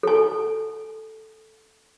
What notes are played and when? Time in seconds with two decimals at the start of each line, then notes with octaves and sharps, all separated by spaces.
0.03 A4 G#5